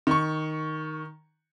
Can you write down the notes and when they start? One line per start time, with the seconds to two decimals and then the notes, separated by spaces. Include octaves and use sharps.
0.07 D#3 C#6